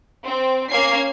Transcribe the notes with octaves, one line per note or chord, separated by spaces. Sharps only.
C4
A#3 C#4 G#6 C7